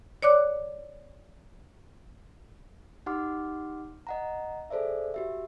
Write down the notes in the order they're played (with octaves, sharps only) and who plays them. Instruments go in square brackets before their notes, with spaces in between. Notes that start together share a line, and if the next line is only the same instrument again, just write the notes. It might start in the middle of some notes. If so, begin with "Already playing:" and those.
[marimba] C#5 D5 D6 F#6
[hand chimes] D#4 G4 F#5 C6 D6 F6
D#5 F#5 A#5
G#4 A4 C5 D5 E5
F#4 G4 E5